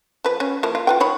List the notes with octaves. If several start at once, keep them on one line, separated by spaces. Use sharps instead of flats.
F3 B4
C#4
F3 A#3 E4
F4
F4 B4 G5
D#3 C#5 B5